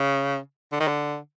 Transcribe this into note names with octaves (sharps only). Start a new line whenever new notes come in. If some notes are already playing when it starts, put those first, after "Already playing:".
Already playing: C#3
D3
D#3
D3